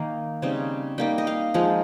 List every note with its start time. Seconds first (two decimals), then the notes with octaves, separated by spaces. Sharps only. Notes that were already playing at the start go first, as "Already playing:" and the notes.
Already playing: D#3 A#3 D#4 F5
0.42 C#3 G3 C4 D#4
0.98 G3 A#3 D#4 G5
1.18 D#5
1.27 F5
1.54 F3 G#3 D#4